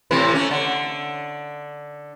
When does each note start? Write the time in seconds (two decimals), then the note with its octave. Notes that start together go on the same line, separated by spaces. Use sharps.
0.11 A2 C3 E3
0.34 A3 C#4
0.51 D3